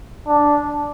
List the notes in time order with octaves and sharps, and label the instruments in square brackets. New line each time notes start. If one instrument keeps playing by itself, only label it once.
[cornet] D4